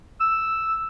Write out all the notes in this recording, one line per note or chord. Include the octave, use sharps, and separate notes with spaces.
E6